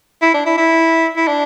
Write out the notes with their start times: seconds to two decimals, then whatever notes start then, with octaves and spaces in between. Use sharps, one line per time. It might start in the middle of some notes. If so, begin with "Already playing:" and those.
0.22 E4
0.34 D4
0.46 E4
0.58 E4
1.17 E4
1.28 D4